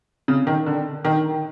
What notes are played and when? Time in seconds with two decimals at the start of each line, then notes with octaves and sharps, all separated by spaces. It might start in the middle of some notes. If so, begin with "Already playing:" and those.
0.28 C#3
0.47 D#3
0.66 D3
1.05 D#3